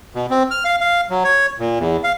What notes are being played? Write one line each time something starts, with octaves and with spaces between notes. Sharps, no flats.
B2
C4
F6
F5
F5
F#3
C#5
A#2
E2
F5